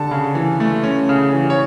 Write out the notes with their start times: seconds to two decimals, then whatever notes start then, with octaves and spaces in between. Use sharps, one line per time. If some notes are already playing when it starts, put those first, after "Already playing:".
Already playing: D3 A5
0.11 C#3
0.35 E3
0.60 A3
0.84 C#4
1.09 C#3
1.33 E3
1.50 C#5